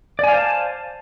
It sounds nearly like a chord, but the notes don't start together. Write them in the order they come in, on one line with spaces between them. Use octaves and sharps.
D5 G#5 F5 C5 A5